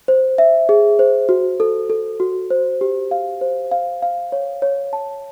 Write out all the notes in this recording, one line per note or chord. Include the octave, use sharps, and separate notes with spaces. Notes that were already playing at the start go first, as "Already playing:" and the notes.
C5
E5
G#4
C5
F#4
A4
A4
F#4
C5
G4
F5
C5
F5
F5
C#5
C#5
A5